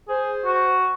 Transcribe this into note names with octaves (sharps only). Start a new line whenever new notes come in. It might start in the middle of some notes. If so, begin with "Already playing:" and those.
G#4 C5
F#4